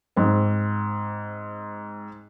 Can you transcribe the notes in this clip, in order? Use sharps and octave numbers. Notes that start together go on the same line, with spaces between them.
G#2 C4